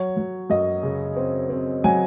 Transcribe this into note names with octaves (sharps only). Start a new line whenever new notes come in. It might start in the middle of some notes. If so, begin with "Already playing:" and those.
Already playing: F#3 C#5
F#3
F#2 D#5
C#3
C4
C4
F#3 G#5